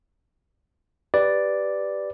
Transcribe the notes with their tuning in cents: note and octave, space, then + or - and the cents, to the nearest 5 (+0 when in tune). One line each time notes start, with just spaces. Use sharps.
G4 +0 B4 +0 D5 +0